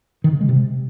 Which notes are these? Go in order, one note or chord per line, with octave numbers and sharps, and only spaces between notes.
D#3
C#3
G#3
C3